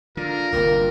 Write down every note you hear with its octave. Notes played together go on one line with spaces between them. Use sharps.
D3 F4 A#4
G1 C2 G2 D#3 G3 A#3